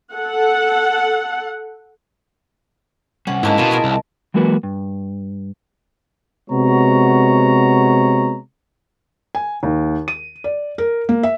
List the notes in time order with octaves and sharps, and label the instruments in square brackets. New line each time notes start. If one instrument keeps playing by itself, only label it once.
[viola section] A4 F#5
[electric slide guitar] C3 G3 [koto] C#4 [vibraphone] F#5
[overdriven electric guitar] G#2 [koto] D3 A#3 C#4 [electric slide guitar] E4 [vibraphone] D#5 A5
[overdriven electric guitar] B2 [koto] F4 C#5 D5
[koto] F4 G#4 A#4
[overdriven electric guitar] C2
[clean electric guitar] E3 F#3 G#3 A#3 F#4 B4
G2
[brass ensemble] C3 G#3 B3 F#4 C#5 A#5
[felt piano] G#5
D#2
D#7
D5
A#4
A#3
E5